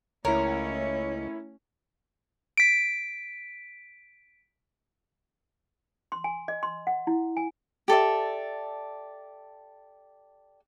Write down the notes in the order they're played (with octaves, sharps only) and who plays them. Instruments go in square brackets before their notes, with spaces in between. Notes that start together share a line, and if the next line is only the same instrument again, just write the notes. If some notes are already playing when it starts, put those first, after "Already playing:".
[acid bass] C#2 [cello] A3 C#4 [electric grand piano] E4 C#5 [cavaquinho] A#4
[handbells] B6 D7
[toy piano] C6
G#5
D#5
C6
F#5
E4
G#5
[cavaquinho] G4 A4 D5 E5